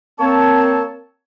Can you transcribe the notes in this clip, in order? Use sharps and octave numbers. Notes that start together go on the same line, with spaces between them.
A#3 C4 C#5 A5